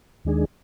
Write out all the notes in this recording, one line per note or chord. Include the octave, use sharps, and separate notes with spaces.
D#2 D#3 G#3 D4 G#4